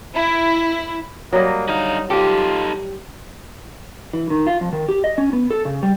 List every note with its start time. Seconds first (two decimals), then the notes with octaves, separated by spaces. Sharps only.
0.15 E4
1.33 F#3 G3 A#3 D#5
1.68 D3 D#4 F5
2.10 D#4 F4 G4 A4
4.13 E3
4.30 D#3
4.46 F4
4.61 F2
4.72 D#3
4.89 G4
5.04 D#5
5.18 C#4
5.33 B3
5.50 A4
5.65 C#3
5.83 G3